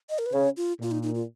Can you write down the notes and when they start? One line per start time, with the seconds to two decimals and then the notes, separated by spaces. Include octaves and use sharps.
0.10 D#5
0.19 A#4
0.26 B4
0.33 C#3 C#5
0.57 F4
0.80 A#2 F4
0.91 D#4
1.03 D#4
1.15 F4